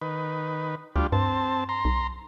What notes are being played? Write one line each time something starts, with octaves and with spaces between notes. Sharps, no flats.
D#3 B4
D2 G3 D4 F4
G2 C4 A5
A#5 C6
B1